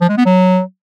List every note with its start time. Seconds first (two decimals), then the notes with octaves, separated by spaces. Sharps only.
0.01 F3
0.09 G#3
0.17 B3
0.26 F#3